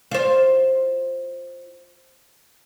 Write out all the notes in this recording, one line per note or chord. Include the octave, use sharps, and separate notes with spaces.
F4 C5